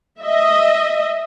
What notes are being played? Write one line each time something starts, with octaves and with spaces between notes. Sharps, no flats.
D#5 E5